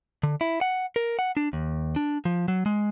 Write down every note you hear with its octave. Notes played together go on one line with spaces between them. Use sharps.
D3
E4
F#5
A#4
F#5
D4
D#2
D4
F3
F#3
G#3